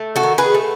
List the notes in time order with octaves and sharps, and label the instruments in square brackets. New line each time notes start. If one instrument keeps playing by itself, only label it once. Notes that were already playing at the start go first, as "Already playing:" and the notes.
Already playing: [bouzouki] A3
F#4 A4
D#3
G#4 B4
A3